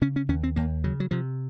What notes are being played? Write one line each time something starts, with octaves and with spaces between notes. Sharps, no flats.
C#3 C#4
C#4
D#2 C#4
C4
D#2 A#3
C#3 F#3
F#3
C3 F3